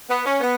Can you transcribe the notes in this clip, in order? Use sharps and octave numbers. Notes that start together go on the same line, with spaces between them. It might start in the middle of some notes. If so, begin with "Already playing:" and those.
B3
C#4
B3